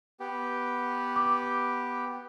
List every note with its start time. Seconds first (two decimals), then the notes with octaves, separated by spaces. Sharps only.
0.20 B3 G4
1.16 D6